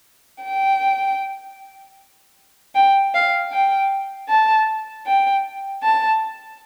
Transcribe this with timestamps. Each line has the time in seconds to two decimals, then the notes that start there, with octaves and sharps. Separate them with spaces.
0.44 G5
2.75 G5
3.14 F5
3.52 G5
4.29 A5
5.06 G5
5.83 A5